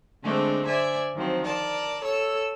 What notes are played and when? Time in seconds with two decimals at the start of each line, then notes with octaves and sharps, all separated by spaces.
0.23 D3 G#3 A3 C4 D4
0.65 C5 D5 E5 G#5
1.15 D#3 F3 F#3 C4
1.44 A#4 D5 A5
2.03 A4 C#5 E6